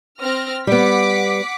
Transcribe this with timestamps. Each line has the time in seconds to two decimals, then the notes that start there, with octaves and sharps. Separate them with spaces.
0.20 C4 F6 A#6
0.67 G3 B3 F#5 D6 B6